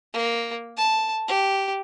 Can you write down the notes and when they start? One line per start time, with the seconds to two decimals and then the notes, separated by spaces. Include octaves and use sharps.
0.13 A#3
0.77 A5
1.28 G4